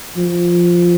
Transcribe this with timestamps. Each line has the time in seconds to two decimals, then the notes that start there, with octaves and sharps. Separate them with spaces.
0.17 F3